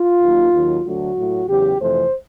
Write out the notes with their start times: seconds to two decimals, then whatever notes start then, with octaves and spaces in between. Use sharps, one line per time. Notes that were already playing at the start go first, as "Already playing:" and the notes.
Already playing: F4
0.21 D#2 D#3 F#3 A#3
0.53 D#2 D#3 F#3
0.84 D2 D3 F#3 A3 F#4
1.16 A2 F#3 A3
1.48 E2 C#3 F#3 G4
1.80 F2 C3 E3 A3 C5